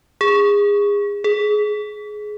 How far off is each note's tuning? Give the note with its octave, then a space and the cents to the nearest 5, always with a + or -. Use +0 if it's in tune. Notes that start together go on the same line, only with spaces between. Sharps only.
G#4 -25
G#4 +20